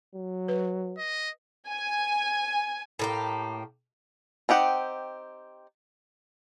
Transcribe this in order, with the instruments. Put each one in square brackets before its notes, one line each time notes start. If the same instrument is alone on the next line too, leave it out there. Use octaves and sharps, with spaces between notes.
[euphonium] F#3
[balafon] B4
[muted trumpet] D#5
[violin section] G#5
[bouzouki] A2 A#3 G4
[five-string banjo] C4 D#4 G4 F#5